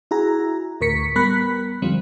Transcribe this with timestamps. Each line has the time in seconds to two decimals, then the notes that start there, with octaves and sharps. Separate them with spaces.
0.11 E4 F#4 G#4 A#5
0.81 D2 A2 A#4 C#6 B6 C#7
1.15 G3 B3 A#4 B5 F#6 B6
1.82 E2 D3 F3 G3 C4